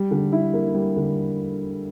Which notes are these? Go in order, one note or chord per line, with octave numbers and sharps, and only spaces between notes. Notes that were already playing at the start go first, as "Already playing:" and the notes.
Already playing: G3
D3
E4
A#3
G3
D3